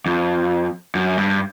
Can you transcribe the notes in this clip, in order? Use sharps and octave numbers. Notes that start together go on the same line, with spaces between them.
F2
F#2
G2